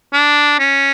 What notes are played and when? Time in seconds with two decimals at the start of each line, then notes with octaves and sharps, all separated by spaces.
0.13 D4
0.59 C#4